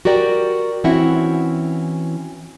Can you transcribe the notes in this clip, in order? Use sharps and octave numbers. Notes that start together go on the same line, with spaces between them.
F#4 G4 A#4 D5 G5
E3 C4 C#4 E4 F#4 F#5